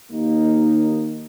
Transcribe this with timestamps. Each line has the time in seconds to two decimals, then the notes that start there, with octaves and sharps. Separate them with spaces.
0.12 D#2 A#3 D#4